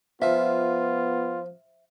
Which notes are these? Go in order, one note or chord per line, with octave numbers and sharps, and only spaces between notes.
F3 B3 F4 E5